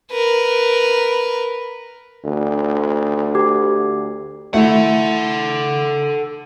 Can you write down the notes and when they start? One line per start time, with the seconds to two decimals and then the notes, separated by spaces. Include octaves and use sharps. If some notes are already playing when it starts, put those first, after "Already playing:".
0.12 A#4 B4
2.25 D2
3.35 G4
4.54 A3 E4 A4 F#5